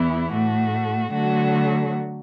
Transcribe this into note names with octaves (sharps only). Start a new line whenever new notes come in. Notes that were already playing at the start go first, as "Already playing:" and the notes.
Already playing: E2 E3 B3 E4
A2 A3 F#4
D3 F#3 A3 F#4